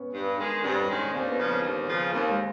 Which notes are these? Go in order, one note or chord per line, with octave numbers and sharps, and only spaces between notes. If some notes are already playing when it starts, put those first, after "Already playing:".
Already playing: B3 C#4
G2
D#3 G#3
G2 C4 D4
C#4 D#4
D#3 G#3
C#4 D#4
D#2 C4 D4
B3 C#4
C#3 F3
A#3 C4
D#2
C#3 F3
D#2 A#3 C4
G#3 A#3